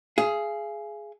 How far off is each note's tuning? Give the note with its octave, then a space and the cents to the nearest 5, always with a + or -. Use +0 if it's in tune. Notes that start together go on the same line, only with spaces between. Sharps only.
G#4 +10 F5 -40